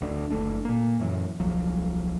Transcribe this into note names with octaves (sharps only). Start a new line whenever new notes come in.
D1 D2 D4
F#1 A3 D4
A#2 A#3
F#2 E3 F#3
D#1 C2 F3 F#3